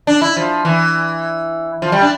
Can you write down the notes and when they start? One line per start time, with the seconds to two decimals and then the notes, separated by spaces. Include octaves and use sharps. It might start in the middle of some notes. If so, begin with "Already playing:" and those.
0.07 D4
0.22 E4
0.37 F3
0.65 E3
1.82 F3
1.92 G3
2.01 D4